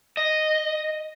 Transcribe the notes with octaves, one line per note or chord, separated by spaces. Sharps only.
D#5